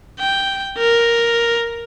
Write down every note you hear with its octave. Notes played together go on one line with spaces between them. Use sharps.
G5
A#4